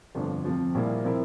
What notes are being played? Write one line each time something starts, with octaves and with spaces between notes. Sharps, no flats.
G1 F2 D3 F3
F2 C3 F3
A#1 A#2 G3 A#3 E4
C3 F3 C4 E4 A#4